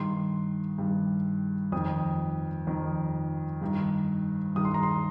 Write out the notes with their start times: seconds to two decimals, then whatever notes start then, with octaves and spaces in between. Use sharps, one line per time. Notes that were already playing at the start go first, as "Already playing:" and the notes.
Already playing: G2 D#3 C6
0.78 G2 D#3
1.72 F2 D#3 D#6
2.67 F2 D#3
3.61 G2 D#3
4.55 G2 D#3 D#6
4.65 C6
4.74 A#5
4.83 C6